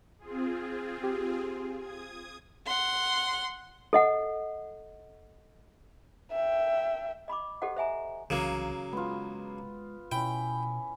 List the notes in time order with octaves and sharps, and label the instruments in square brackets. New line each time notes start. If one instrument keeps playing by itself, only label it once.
[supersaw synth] C4 F4 G#4
[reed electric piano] G4
[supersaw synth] D#6 G#6
[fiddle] F#5 C6
[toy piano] A4 D#5 F#5
[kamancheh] E5 G5
[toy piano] D#5 B5 C6 D6
G4 A4 C5 D#5 F#5
C5 E5 G#5 A#5
[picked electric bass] C2 E3 [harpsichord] C#3 F#3 A#3
[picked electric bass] G#3 [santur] B3 F4
[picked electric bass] B2 [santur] C#4 E4 [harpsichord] G5